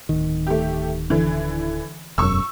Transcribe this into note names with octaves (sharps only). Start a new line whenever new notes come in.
D1 D#3
A3 G4
D3 E3
E1 F#2 C#6 E6